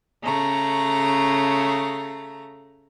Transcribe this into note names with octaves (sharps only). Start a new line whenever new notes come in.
C#3 A3 A#5